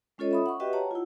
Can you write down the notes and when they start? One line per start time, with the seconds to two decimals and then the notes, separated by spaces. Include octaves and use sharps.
0.18 G#3 C#4 F4 A4 C#5 D#5
0.31 E5 B5 D#6
0.46 F#5 C#6
0.60 F#4 G4 B4 D#5 E5 G5
0.73 C#5 F#5 A5 A#5
0.91 E4 F4